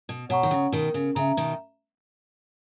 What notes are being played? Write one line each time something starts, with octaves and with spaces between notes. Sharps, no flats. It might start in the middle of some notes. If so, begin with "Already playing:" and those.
B2
B2 C#5 F#5 A#5 C#6
D#3
C#3
B2 D#3 A#4
C#3
C#3 E5 A#5
B2 D#3